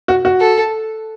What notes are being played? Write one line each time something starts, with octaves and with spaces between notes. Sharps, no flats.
F#4
F#4
A4